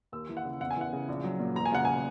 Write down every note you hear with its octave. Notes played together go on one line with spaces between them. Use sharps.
D#2 E6
E3
F#5
C#3
E2 F#5
G#5
E3 F#5
C#3
A#1
F#3
A#2
E1 A#5
G#5
C#3 F#5
G#5